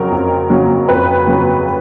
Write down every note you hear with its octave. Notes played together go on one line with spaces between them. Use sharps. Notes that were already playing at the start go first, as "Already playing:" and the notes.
Already playing: F2 C#3 F#3 A#4
F2
C#3 F#3
F2 B4
C#3 F#3